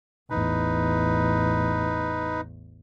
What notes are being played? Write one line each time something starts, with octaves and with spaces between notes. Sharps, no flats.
A1 E2 D#4 B4